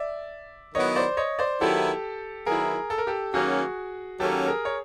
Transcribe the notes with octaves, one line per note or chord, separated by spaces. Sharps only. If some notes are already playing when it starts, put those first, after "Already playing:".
Already playing: D5 E5
D#3 F#3 B3 E4 C#5 D#5
C5 D5
C#5 D#5
C5 D5
D#3 F#3 B3 E4 G4 A4
D#3 F#3 B3 E4 G#4 A#4
A4
A#4
G4 A4
D#3 F#3 A#3 C#4 F#4 G#4
D#3 F#3 A#3 C#4 G4 A4
G#4 A#4
C#5